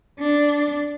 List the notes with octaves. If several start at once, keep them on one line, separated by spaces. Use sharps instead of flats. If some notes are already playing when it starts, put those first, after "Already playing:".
D4